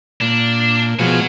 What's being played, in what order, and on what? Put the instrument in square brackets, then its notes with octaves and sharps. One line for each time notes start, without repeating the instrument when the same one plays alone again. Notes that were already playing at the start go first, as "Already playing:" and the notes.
[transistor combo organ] A#2 [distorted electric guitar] D4
[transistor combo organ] B2 F3 G#3 [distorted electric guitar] C#5 F#5